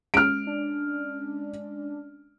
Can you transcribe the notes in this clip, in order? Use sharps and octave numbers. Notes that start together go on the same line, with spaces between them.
G#3 C#4 F6 D7
D4